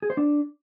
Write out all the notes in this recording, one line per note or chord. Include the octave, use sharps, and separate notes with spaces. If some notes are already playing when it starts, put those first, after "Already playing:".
G#4
C5
D4